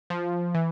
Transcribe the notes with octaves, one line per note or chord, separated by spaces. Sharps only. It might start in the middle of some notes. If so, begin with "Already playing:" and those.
F3
E3